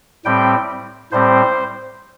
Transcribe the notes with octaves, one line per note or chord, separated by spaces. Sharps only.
A2 G3 C4 G5
A2 G3 C4 C5